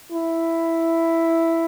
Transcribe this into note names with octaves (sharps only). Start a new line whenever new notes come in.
E4